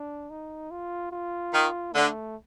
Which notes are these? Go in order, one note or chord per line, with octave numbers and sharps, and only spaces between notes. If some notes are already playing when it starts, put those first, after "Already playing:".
Already playing: D4
D#4
F4
F4
D#3
D3 A3